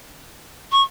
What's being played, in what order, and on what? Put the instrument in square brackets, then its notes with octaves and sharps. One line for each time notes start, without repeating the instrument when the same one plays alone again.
[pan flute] C#6